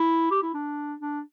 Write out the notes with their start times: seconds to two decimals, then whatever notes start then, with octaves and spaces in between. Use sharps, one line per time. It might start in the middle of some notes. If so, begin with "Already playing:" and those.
Already playing: E4
0.31 G4
0.42 E4
0.54 D4
1.00 D4